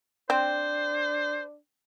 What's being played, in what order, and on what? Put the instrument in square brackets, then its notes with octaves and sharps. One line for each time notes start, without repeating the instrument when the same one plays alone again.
[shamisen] C4 [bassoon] D4 [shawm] C5